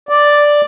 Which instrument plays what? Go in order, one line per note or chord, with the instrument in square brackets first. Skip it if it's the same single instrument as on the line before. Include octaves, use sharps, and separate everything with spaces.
[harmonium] D5